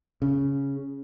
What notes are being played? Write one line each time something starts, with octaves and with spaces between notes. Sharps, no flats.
C#3